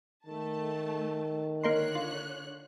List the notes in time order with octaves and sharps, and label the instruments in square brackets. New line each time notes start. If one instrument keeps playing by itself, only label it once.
[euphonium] D#3 [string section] A3 A5
[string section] D3 C#5 F#6 [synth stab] A#3 D#4 C6
[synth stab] F4